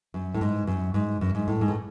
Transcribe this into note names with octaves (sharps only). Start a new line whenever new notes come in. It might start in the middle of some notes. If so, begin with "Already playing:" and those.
F#2
A2
G#2
F#2
G#2
F#2
G#2
A2
G#2
A2